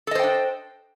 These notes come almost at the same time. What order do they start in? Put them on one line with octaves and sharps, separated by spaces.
A4 D#5 C5 G5 D4